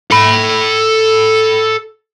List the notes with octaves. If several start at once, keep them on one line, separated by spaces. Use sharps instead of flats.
A4 B5